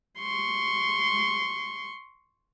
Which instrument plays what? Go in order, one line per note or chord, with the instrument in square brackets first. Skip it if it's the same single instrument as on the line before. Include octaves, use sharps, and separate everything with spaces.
[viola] C6 C#6